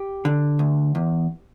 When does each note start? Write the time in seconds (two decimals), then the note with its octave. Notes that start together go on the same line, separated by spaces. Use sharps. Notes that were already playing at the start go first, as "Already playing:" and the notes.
Already playing: G4
0.25 D3
0.59 D2
0.95 E2